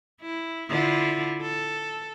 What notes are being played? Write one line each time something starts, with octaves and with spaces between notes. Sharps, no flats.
E4
D3 E4 F4
A4